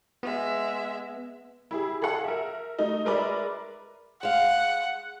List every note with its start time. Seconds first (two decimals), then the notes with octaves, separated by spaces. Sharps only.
0.23 G#3 B3 E5
1.71 E4 G4 G#4
2.02 G#4 A4 F5 F#5 A5
2.24 A#4 E5
2.79 A3 D#4
3.05 G#3 A#4 B4 D5 E5
4.23 G#3 F5 F#5